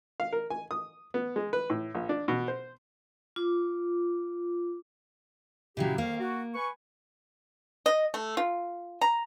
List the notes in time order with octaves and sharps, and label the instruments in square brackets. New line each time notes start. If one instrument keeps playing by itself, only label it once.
[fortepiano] F5
A#4
G#5
D#6
B3
G#3
B4
A2
A#1
D4
B2
C5
[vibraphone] F4 D6
[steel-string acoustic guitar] A#2 C#3 F#3 [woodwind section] E4 G4
[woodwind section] F2 D#3 F5 [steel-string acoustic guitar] A#3
[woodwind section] F#4
B4 G#5 C#6
[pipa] D#5
A3
F4
A#5